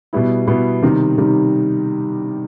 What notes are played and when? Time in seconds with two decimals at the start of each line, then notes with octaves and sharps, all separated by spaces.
0.13 B2 G3 B3 E4
0.47 B2 G3 B3 E4
0.82 C3 D#3 G3
1.18 C3 D#3 G3